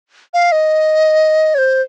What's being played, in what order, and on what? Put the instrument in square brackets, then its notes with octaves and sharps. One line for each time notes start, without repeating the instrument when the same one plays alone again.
[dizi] F5
D#5
C#5
C5